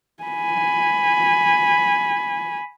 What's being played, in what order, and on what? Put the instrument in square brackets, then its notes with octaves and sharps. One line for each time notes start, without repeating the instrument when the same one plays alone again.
[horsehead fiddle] G#5 B5